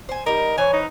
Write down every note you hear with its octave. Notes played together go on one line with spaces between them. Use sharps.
C5 G#5
G3 D#4 A#4
E3 C5 C#5 G#5 A#5
D#4